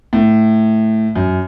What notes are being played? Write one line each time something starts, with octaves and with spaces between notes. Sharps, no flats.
A2
F#2